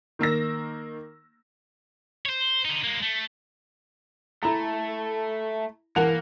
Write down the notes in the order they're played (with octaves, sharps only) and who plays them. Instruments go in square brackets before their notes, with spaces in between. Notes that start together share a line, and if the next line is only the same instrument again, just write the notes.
[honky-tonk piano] D#3 A#3 E6 A#6
[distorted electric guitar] C5 C#5
D3 D#4
G#3 A#3
A3
[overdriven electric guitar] A3 [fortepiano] E4 A#5
[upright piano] E3 A5 F7 [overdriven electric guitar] A#3 [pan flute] A#4 [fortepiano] F#5